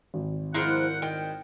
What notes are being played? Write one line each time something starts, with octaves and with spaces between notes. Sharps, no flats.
G#1
F3 G#3 E4 A#4 C5 F#5 F#6
D#3 G5